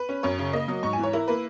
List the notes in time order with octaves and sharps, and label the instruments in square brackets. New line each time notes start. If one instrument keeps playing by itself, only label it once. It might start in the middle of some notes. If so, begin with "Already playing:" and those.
Already playing: [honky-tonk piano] B4
C#4
F#2 C#5
C#3
A#3 D#5
F#3
G#2 C#6
G#5
E3
C#5
E4 A#4
A#3 B4